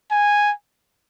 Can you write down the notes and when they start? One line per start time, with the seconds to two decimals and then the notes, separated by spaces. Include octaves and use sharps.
0.11 G#5